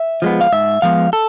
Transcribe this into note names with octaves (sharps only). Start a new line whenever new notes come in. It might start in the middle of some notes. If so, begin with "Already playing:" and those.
Already playing: E5
F3 G#3 B3
F5
G#2 E5
F3 G#3 B3 F5
A4